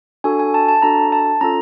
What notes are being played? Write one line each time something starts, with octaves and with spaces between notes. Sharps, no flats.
D4 F#4 A4 G#5
G#5
A5
A5
D4 F#4 A4 A#5
A5
C#4 F4 A4 A#5